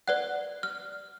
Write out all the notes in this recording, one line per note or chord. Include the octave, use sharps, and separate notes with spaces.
B4 D5 F#5 F#6
F6